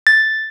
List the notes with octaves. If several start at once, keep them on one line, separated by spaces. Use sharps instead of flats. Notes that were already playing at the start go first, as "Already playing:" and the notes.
A6